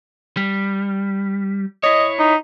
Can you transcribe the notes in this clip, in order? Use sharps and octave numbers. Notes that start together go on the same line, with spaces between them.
G3
E4 C#5 D#5
D#4